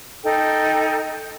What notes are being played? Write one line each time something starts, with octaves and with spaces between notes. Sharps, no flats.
D#4 A4 G5